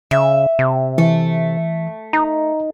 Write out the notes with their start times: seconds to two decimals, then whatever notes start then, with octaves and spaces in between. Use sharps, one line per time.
0.11 C#3 E5
0.59 C3
0.98 E3 A3
2.13 D#4 A#5